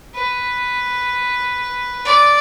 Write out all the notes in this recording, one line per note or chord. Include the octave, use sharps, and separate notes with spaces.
B4
D5